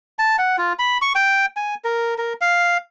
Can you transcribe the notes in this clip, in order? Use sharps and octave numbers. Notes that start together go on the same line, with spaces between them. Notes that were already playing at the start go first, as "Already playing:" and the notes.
A5
F#5
F4
B5
C#6
G5
G#5
A#4
A#4
F5